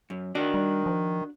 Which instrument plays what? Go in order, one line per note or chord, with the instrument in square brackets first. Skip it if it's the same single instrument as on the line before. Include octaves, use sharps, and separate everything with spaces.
[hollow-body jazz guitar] F#2
[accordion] D#3 [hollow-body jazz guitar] D4 F#4 D5
[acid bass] G3
F3